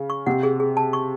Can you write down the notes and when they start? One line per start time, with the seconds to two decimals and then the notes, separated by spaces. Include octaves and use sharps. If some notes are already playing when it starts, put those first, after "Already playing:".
Already playing: C#3
0.10 C#6
0.27 C3 F#5
0.43 G#4
0.60 G#4
0.77 A5
0.93 C#6